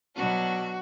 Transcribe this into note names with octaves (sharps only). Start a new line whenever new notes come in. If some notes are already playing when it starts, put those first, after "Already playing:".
B2 F#3 B3 D4 F#4